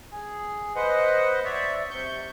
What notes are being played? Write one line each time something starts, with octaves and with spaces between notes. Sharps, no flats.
G#4
B4 C5 D#5 F#5
C#5 D5 E5
C3 C#6 G6